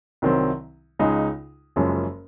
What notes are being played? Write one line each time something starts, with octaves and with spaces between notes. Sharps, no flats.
C2 C3 D#3 F#3 C4
C#2 C#3 G#3 D#4
F#1 F#2 F3 G#3 C#4